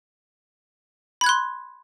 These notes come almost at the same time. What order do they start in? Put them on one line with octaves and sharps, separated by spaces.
B5 G#6 F#6 C6